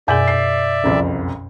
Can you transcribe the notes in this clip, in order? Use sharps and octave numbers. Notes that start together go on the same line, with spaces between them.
F#2 B2 G#4 D5 E5 G#5 G6
C7
F#1 C2 F2